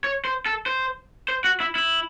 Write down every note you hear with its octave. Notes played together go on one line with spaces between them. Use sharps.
C#5
C5
A4
C5
C5
F#4
E4
E4